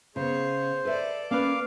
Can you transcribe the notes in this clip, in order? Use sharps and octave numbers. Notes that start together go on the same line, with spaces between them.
C#3 B3 G#4 C5 C#5
A4 B4 D5 E5
A#3 C#4 B4 F5 D6